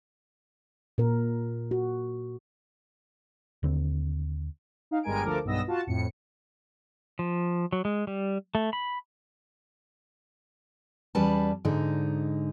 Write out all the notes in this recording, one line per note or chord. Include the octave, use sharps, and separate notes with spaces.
A#2 A#4
F#4
D#2 D3 C4
D#4 F5
G1 G3 G#3 A#4 G#5 D7
D2 F3 A4 A#4 D6
B1 G2 B3 D#5 E6 A#6
F4 F#4 A5
F2 A2 C#7
F3
F#3
G#3
G3
A3
B5
E2 G3 C#4 B4 D5 A5
G#2 D3 D#4